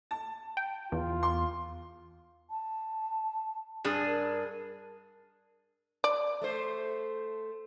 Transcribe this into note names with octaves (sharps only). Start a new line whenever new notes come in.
A5
G5
E2 F4
C6
A5
G2 D4 G#4
A#4
D5
A3 C5